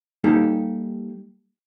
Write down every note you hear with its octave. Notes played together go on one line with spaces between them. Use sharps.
G3 A#3 D#4 G4 A4